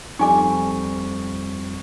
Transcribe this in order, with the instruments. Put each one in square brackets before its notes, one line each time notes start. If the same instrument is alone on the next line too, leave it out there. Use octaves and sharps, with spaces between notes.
[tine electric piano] F2 G3 C#6 [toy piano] D#4 G#5 D6